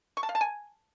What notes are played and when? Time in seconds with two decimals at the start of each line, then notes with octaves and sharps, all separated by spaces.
0.17 C#6
0.23 A5
0.29 F5
0.35 A5
0.41 G#5